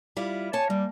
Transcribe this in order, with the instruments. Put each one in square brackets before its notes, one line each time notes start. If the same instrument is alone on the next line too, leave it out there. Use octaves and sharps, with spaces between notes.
[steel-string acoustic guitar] G3 E4 F4
[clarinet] C#5 [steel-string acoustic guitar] G#5 A5
[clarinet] G3 [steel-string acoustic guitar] A#3